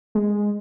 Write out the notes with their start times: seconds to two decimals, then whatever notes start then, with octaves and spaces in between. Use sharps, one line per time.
0.15 G#3